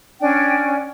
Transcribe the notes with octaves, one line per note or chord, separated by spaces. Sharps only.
C#4 D4 G5 G#5